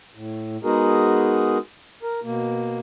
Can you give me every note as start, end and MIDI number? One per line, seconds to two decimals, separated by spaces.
0.15 0.57 45
0.64 1.58 56
0.64 1.58 59
0.64 1.58 63
0.64 1.58 66
0.64 1.58 68
0.64 1.58 70
2.03 2.20 70
2.24 2.79 47
2.24 2.79 58